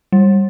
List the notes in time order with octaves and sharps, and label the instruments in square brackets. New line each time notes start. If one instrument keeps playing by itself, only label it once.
[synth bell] G3